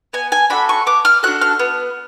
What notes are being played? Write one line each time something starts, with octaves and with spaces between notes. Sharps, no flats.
B3 G#5
G#5
D4 F#4 A4 B5
C#6
B3 D6
F6
D4 F#4 A4 F#6
F6
B3